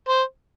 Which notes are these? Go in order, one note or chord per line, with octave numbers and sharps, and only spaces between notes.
C5